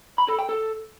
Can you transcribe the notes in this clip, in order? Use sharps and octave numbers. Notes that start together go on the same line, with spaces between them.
B5
A4
G5
A4